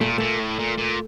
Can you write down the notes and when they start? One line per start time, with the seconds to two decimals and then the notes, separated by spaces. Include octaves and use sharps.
0.01 A#2 A3
0.18 A#2 A3
0.39 A2
0.59 A#2
0.78 A#2